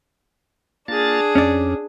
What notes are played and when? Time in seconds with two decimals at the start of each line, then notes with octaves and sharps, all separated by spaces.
0.88 A#3 D4 F4 G#4 A6
1.35 F2 C#4 D5